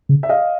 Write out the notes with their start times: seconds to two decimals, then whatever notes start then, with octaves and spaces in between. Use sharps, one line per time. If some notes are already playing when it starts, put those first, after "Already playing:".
0.09 C#3
0.23 E5
0.29 D#5 F5